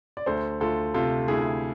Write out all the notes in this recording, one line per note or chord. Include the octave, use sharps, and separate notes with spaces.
D5
D2 A4 C5
D2 F4 A4
C3 F4 A4
D2 E4 G#4